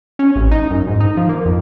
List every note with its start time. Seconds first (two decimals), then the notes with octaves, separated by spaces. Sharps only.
0.19 C#4
0.36 A1
0.51 D#4
0.70 F#2
0.87 G#2
1.00 D#4
1.17 F3
1.29 A#3
1.45 F2